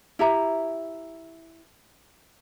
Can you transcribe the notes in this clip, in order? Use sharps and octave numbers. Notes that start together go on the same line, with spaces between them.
E4 G4 E5 A#5